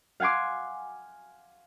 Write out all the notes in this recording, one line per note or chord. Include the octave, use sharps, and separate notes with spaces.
F5 F#5 G#5 C6 D6